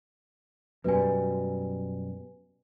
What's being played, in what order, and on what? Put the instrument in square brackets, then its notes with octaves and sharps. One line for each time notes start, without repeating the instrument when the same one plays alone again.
[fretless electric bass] F#2 B2 G3 [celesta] B4 G#5